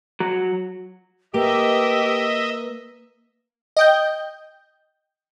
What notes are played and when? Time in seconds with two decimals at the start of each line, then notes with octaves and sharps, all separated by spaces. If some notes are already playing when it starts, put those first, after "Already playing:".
0.20 F#3
1.34 A#3 G4 B4 D#5 E5
3.77 D#5 G5 G6